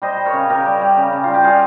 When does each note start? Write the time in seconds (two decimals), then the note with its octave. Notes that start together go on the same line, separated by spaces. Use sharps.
0.02 G3 C5 D#5
0.17 G3
0.25 A#4 C#5
0.33 C#3
0.49 C#3 G4 A#4
0.66 G3
0.81 G3
0.97 C#3
1.13 C#3
1.24 G3 F4
1.34 G4
1.44 G3 F4 G#4